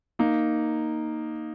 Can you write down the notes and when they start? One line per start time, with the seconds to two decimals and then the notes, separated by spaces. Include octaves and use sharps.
0.19 A#3 D#4